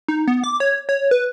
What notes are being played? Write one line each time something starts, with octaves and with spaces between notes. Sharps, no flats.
D#4
B3
D6
C#5
C#5
B4